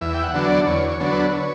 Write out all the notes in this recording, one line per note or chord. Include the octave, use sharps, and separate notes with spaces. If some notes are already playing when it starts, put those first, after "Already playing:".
E2 E5
G5
F#5
D3 F#3 B3 D4
D5
E2 C#5
C#5
D3 F#3 B3 D4
B4
B4
C#5